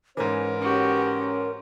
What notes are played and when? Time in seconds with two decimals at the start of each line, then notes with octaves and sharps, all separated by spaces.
0.17 G#2 E3 C#4 A#4 C5
0.61 C#4 F#4 G4